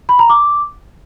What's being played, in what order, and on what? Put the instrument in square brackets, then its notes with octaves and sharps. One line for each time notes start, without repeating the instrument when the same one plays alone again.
[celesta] B5
A#5
D6